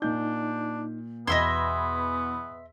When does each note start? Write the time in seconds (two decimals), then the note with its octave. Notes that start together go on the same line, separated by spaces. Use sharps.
0.02 A#2 D4 D#4 G6
1.27 E2 B2 B3 D#5 E5 B5 C6 G#6